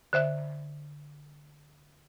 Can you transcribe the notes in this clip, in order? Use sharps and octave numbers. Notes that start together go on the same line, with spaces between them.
D3 C5 E5 F#6